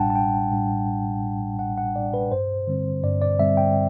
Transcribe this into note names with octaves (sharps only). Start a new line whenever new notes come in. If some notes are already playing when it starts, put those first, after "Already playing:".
Already playing: A1 A2 G3 D4 F#5 G5 A5
A5
A1 G5
A2 G3 D4
A1
A2 G3 D4
A1 F#5
F#5
A2 G3 D4 D5
B4
G2 C5
D3 G3 C4
G2 D5
D5
D3 G3 C4 E5
G5